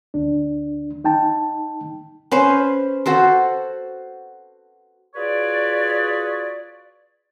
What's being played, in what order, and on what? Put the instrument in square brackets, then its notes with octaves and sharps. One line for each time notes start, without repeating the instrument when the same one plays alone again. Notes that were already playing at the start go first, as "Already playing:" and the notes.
[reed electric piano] D2 D4
D#4 G5 A5
[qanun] C#4 B4 C5
F#4 A4 C5
[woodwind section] F4 F#4 G#4 B4 C#5 D5